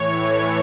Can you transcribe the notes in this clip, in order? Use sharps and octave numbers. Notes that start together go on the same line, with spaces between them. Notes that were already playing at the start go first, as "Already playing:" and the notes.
Already playing: A2 E3 C#5